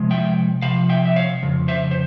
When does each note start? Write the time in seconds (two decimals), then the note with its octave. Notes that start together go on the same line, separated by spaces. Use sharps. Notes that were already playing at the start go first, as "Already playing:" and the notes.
Already playing: C3 F3 G#3
0.11 E5 G5
0.62 C3 F3 F5
0.89 E5 G5
1.05 E5
1.16 C#5 F5
1.43 F2 C#3
1.68 C5 E5
1.91 C5